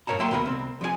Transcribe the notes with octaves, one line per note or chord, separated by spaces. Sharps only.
G2 A#4 C#5 A5 A#5
F#3 A#3 E5 G5 C6
D#2 B2 B3 G#4 A#4 B5
C2 C4
F3 G#3 C#5 G#5